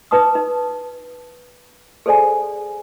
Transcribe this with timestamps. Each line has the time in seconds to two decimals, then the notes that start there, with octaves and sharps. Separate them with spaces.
0.11 D#4 B4 A5 D6 D#6
0.35 D#4
2.06 G#4 A4 C5 D5 G#5